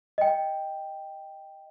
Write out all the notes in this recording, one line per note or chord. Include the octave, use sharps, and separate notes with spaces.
D#5 G5